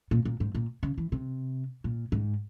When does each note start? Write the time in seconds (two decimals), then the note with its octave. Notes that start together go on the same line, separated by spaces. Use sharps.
0.11 A#2
0.25 A#2
0.40 G#2
0.55 A#2
0.83 C#3
0.98 E3
1.12 C3
1.84 A#2
2.12 G#2